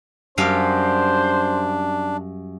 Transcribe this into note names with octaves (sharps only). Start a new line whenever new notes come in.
F#2 G3 D4 C5 F5